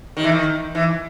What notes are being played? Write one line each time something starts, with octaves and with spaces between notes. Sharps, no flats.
D#3
E3
D#3
E3